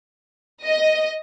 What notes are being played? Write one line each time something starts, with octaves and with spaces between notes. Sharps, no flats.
D#5